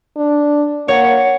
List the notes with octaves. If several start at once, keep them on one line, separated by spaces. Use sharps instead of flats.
D4
A#3 C#5 F#5